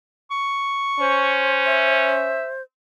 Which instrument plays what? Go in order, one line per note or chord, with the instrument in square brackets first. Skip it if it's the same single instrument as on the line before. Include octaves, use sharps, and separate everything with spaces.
[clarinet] C#6
[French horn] C#4 [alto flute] C5
[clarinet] E5